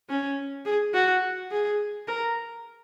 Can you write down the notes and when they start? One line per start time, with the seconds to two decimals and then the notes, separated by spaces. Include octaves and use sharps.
0.09 C#4
0.65 G#4
0.94 F#4
1.51 G#4
2.08 A#4